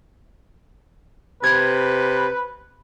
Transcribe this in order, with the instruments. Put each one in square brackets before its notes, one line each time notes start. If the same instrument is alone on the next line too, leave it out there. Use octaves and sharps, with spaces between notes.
[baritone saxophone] C3 [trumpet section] B4 [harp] G#6